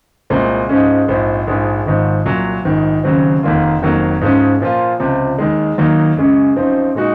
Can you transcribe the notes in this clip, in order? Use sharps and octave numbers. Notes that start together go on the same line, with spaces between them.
C2 A#2 G#3 C4
G#2 F3 G#3 C#4
A#1 G#2 F3 C4
A#1 G#2 F3 G#3
G#1 G#2 F3
C2 A#2 F#3
A#1 G#2 D#3
D#2 C#3 F#3 C4
F1 D#2 D#3 A#3 F4
F1 F2 D#3 F#3 A#3
G#2 F3 G#3 C#4
A#2 F3 A#3 F4
C#2 C3 F3
D#2 D#3 G#3
D#2 D#3 F#3 A#3 D#4
F#2 C#3 G#3 C#4
F#2 F3 C4 D#4
A#2 G#3 D#4 F#4